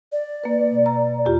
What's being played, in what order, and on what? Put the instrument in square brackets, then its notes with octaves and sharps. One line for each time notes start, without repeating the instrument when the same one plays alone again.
[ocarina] D5
[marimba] A#3 B4
B2
A#5
E2 F4 G4